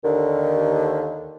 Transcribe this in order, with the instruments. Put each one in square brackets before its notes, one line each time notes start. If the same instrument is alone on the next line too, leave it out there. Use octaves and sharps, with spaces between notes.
[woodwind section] D#2 D3 D#3